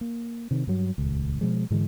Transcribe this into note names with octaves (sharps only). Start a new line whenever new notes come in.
A#3
C3 D#3
G2 F#3
D#1 C#2
B2 F3 G#3
G#2 D3 E3 G#3